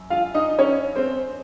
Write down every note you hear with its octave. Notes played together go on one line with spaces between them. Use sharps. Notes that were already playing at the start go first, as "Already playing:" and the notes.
Already playing: F#2
F4 F5
D#4 D#5
C#4 C#5
C4 C5